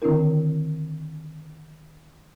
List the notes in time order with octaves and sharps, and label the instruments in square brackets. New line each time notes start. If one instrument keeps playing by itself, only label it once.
[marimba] D3 D#3 C4 D4 E4 A#4